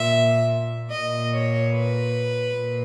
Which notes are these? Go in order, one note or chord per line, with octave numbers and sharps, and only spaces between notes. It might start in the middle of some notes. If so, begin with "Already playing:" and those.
Already playing: A#2 E5
A#2 D#5
C#5
B4
A#2